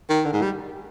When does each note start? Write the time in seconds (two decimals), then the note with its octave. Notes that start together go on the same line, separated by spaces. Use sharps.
0.09 D#3
0.25 D3
0.33 G#2
0.42 G3